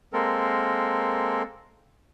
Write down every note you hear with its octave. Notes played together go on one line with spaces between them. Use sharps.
G#3 A#3 C4 A4 A#4